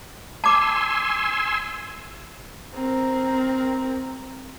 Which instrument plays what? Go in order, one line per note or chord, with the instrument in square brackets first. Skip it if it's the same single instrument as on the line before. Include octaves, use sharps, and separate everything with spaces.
[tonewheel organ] G#5 C6 E6 [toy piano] A5 D6
[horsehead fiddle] C4 A#4